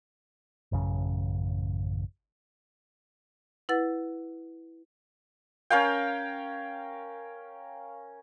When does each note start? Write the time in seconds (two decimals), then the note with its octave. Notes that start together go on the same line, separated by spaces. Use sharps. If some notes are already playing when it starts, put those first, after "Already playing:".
0.72 A1 F#2 C#3 C#4
3.69 E4 B4 F#5 A6
5.70 C#4 A#4 F5 G5